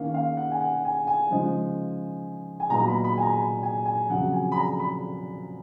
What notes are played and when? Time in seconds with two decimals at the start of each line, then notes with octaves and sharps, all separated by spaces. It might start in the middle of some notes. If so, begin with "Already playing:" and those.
Already playing: D#3 A#3 C#4 F5
0.14 F5
0.37 F#5
0.52 G#5
0.61 F#5
0.85 G#5
1.07 G#5
1.30 C#3 F3 G#3 D#4
2.60 G#5
2.69 A#2 F#3 B3 D#4 A#5
2.80 A#5
2.88 B5
3.04 B5
3.17 G#5
3.22 A#5
3.39 B5
3.63 G#5
3.86 G#5
4.09 F2 C#3 F#3 F#5
4.33 G#5
4.52 B5
4.57 A#5
4.79 B5